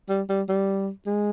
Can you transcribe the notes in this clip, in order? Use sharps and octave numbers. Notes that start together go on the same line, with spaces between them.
G3
G3
G3
G#3